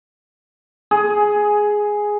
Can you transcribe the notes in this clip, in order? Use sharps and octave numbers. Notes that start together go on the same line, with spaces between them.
G#4